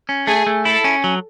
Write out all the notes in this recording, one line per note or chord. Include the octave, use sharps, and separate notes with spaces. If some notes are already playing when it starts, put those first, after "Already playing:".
C#4
A3 G#4
A3
E4 A4
C#4
F#3